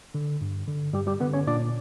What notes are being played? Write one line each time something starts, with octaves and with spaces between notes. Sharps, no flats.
D3
G2
D3
G2 G3 G4
G3 G4
D3 B3 B4
C#4 C#5
A#2 D4 D5